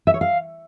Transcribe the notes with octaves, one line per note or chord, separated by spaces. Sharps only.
E5
C#5
F5